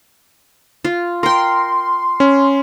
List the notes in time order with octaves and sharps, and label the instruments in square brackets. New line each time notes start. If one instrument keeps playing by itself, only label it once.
[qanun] F4
[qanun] A#4 G5 [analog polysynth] C6
[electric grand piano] C#4